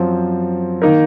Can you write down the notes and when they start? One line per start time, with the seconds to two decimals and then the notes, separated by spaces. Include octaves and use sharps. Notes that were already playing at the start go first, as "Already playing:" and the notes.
Already playing: F#2 F3 C4
0.82 D#3 A#3 D#4 A#4